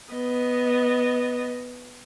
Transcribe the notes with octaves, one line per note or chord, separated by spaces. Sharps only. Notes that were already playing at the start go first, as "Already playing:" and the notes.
B3 D#5